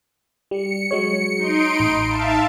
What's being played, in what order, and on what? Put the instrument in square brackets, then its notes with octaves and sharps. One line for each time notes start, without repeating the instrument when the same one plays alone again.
[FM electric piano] G3 [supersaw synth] C#7
[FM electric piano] F#3 G#3 C#5 [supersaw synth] C#7
[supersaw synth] D#4 C6 D7
[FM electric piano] A1 B5
[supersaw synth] E5 F5 A5